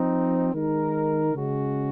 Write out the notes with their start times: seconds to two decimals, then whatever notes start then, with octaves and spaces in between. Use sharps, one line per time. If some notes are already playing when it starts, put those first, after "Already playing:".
Already playing: F3 C4 D#4
0.51 D#3 G#3 D#4 A#4
1.34 C#3 G#3 C#4 F#4